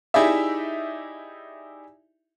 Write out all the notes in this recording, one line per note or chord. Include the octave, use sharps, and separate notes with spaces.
D#4 E4 G4 G#4 D5 E5